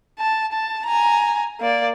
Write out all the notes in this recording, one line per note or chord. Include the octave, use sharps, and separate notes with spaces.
A5
A5
G#5 A#5
A#3 D5